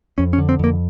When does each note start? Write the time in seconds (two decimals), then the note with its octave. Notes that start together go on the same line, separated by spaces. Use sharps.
0.18 F2 C#4
0.33 C#4
0.38 D3
0.49 C4
0.59 F2 A#3